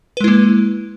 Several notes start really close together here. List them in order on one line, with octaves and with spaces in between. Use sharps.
B4 G#3 E4 A#3